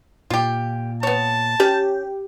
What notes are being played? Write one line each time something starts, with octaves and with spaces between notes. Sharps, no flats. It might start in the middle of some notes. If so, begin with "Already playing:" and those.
A#2 F4 G4
B3 C#5 A5
C#4 G4